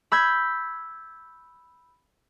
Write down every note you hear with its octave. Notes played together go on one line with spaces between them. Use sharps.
B5 E6 G6 G#6 B6